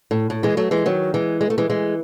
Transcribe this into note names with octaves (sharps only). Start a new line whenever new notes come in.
A2
A2
E3 G#3
F#3 A3
E3 G#3
D#3 F#3
E3 G#3
G#3
A3
E3 G#3
E3 G#3